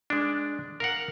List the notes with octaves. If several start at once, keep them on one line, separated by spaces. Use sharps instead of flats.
G#3 D4
A#4 F5 F#5